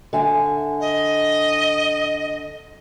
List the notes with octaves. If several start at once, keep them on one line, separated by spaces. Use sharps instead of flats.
D3 E5 G#5
D#5